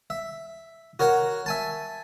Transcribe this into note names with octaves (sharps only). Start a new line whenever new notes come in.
E5
F#4 A#4 C#5 F#5
E5 G#5 A5